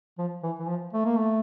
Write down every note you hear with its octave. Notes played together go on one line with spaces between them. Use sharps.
F3
E3
E3
F3
A3
A#3
A3